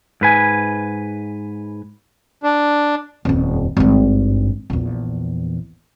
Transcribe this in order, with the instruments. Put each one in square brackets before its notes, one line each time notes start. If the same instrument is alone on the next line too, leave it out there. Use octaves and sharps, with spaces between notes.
[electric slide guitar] G#2 B4 G#5
[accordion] D4
[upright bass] D#1 F2
G#1 G2
A#1 E2